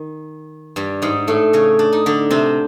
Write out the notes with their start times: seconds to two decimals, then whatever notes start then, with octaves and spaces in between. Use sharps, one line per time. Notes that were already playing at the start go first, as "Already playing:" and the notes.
Already playing: D#3
0.76 G2 G3
1.02 G#2 G#3
1.27 A2 A3
1.53 C#3 C#4
1.79 D4
1.93 D#4
2.06 D3 D4
2.31 C3 C4